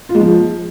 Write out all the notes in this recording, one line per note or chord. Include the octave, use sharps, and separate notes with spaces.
F4
G#3
F3